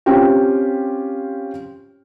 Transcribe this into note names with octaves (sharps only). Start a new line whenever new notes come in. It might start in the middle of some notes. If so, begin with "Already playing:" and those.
C4 C#4 F4 G4 G5